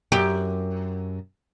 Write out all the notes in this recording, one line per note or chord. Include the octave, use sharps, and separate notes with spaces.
F#2 G4